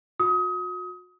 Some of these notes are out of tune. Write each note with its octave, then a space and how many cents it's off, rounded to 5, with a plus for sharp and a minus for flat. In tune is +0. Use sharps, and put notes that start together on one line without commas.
F#4 -40 D#6 +30